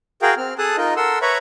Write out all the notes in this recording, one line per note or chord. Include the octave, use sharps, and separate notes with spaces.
F#4 G#4 A#4 F5 G5
C4 F6
G#4 A4 A5 D#6 F#6
D#4 F4 A#4 D#5
A4 A#4 F#5 C6 E6
B4 C#5 E5 A#5 B5 C#6